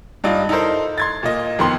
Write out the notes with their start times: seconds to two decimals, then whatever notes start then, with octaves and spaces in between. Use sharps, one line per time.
0.24 G2 D4 D#4 F4
0.49 D#4 E4 A4 A#4 C5
0.98 C6 G#6 A6
1.23 A#2 A#3 D#5
1.59 F2 D#3 B3 C6